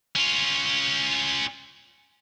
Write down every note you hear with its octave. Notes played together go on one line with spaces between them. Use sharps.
C#4 F4